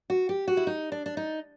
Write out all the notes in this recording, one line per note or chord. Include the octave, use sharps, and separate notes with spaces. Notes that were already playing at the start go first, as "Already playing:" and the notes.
F#4
G4
F#4
E4
D#4
D4
D4
D#4